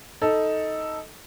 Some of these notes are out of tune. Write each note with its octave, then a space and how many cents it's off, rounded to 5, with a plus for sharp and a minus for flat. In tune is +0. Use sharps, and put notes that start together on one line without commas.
D#4 +10 A4 +0